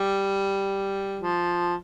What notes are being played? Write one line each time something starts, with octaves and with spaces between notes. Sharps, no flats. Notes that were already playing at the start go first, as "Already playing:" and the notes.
Already playing: G3
F3